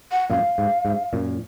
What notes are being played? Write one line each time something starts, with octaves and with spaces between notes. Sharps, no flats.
F#5
F#2 A#2 F5
G#2
G#2
F#2 A#2